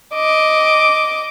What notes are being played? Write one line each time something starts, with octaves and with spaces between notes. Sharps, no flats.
D#5 D6